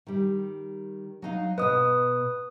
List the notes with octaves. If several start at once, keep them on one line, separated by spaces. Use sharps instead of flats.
D#3 G3
F#3 D#4 F5
B2 B4 D#5 D#6